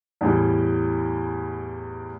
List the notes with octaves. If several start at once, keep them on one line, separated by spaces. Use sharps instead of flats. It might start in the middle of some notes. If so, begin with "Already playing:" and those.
E2 A2 G3